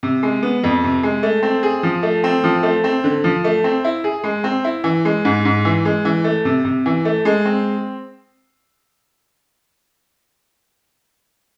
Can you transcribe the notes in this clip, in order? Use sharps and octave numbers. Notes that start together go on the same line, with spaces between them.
C3
G#3
B3
F2
C3
G#3
A3
C4
G#4
F3
A3
C4
F3
A3
C4
D3
F3
A3
C4
E4
G#4
G#3
C4
E4
E3
G#3
G#2
G#2
E3
G#3
E3
A3
C3
C3
E3
A3
G#3
C4